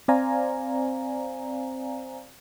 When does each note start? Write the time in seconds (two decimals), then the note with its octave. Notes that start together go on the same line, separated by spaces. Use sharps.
0.08 C4 C5 D5 F5 G#5 A#5